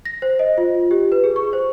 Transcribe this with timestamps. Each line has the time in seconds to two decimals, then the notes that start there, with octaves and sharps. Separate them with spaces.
0.05 A#6
0.22 C5
0.39 D#5
0.58 F4
0.91 G4
1.12 B4
1.24 G#4
1.36 C#6
1.53 C5